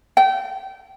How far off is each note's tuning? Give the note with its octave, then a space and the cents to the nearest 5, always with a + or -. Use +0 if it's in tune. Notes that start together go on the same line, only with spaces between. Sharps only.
G5 -30